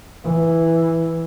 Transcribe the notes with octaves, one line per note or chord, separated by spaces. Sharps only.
E3